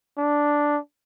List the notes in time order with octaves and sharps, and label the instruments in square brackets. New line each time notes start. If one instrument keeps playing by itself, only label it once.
[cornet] D4